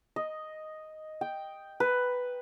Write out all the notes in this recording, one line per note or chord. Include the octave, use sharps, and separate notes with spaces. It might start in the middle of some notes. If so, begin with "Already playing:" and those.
D#5
G5
B4